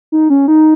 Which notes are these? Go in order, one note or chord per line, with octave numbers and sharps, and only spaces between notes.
D#4
C#4
D#4